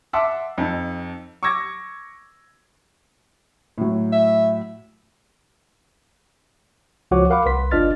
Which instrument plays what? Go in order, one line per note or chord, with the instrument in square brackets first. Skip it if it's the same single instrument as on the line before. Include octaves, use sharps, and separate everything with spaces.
[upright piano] E5 F#5 A5 C6 D6 E6
F2 D#4
C#6 D6 E6 G#6 A#6
[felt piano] A2 F#3
[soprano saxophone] E5
[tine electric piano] C#2 F3 F#4 C#5 F#5 D6
A#4 F5 F#5 B5 D6
C2 B4 C6 B6
G1 D4 F4 D#5 F6 A6